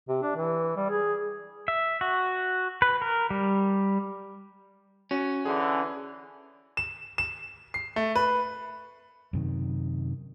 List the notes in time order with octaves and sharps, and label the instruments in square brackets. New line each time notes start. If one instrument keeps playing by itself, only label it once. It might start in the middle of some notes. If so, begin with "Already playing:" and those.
[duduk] C3
D4
E3
G3
G#4
[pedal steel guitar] E5
F#4
B4
A#4
G3
[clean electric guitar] C#4 [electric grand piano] F#4
[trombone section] D3 E3 [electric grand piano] G#4
[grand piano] E7
E7
C7
A3
B4
[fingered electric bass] F#2 C3 D#3